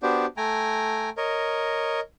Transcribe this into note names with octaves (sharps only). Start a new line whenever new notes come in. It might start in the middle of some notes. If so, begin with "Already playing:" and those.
B3 D4 F#4 G4 C5 D5
A3 G5 G#5 A#5
A#4 C#5 D#5